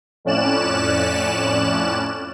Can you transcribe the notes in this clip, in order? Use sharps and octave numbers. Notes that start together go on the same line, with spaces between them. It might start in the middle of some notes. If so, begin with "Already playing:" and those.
F2 A2 C#4 D5 F#6 E7